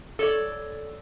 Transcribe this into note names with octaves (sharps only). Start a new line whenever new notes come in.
A4 C#5 D5